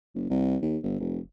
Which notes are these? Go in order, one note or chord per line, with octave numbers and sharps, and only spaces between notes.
F#1
C2
D#2
G1
F1